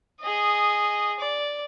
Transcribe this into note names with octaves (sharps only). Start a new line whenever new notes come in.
G#4 D#5
D5